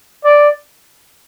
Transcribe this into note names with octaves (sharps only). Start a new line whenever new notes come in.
D5